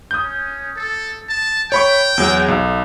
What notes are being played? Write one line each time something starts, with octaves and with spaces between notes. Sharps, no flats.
C#4 D#6 G6
A4
A5
C#5 G5 B5 C#6
E2 F#3
B1